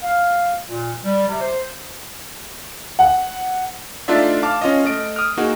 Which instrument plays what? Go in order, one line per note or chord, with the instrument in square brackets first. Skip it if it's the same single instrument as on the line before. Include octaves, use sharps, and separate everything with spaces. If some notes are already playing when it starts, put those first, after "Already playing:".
[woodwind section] F5
A#2
G3
C3
C5
[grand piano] F#5
[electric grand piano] A3 D4 D#4 F4 D5 E5
F5 A5 D6 F6
C#4 F4 D#5
A3 D#5 D7
D#6 F6
A#3 D#4 F#4 G#4